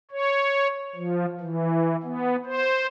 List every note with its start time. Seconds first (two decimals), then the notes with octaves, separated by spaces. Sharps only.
0.11 C#5
0.96 F3
1.40 E3
2.03 B3
2.45 C5